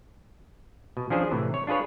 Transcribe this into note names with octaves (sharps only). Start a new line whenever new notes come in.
B2
F3 C#4 D4 G#4 C5
A2 C3 E3
C#5
D4 F4 G#4 B4 C#5